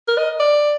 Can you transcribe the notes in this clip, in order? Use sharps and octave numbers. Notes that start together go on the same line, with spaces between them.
A#4
D#5
D5